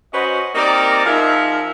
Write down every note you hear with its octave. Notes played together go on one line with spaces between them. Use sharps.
C#4 F#4 B4 C5 D#5
A#3 C4 D#4 G4 A#4 D5
F3 D#4 G#4 A#4 E5 F5